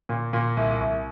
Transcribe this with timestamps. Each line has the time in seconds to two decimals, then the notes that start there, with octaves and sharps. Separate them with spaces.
0.09 A#2
0.33 A#2
0.57 C2
0.81 C2